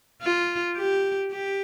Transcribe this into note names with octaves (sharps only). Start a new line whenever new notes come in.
F4
G4
G4